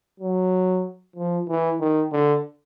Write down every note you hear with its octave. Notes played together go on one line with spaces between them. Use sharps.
F#3
F3
E3
D#3
D3